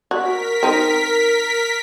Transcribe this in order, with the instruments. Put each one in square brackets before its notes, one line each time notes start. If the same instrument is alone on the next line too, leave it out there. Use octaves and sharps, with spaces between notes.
[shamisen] F#4 [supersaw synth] A#4 B6
[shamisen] C4 D#4